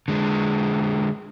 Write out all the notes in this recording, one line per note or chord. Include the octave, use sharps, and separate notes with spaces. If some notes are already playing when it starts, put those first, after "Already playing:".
D3 G#3